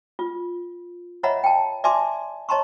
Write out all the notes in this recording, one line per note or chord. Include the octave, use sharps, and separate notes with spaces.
F4
C#5 D#5 E5 F#5 A#5 B5
G5 A5
D5 E5 G#5 A5 C6 D6
C#5 D#5 A5 A#5 C6 C#6